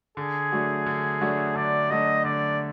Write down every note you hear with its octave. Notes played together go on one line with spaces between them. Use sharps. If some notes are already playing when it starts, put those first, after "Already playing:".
D3 G#4
F#3 A3 D4 F#4
D3
F#3 A3 D4 F#4
D3 D5
F#3 A3 D4 F#4 D#5
D3 D5